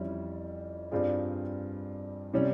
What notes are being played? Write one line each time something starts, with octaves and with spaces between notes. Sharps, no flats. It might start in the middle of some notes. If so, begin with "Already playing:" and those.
Already playing: F2 E3 G3 C#4 E4
G2 G3 C4 F4 G#4
C3 G3 C#4